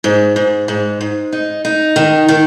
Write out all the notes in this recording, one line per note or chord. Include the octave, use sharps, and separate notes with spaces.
G#2
G#2
G#2
G#2
D#4
D#4
D#3
D#3